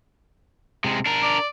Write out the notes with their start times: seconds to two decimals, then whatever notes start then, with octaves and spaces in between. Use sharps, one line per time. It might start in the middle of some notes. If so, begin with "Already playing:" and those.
0.84 C3 G#3
1.06 D4 A#4
1.23 D5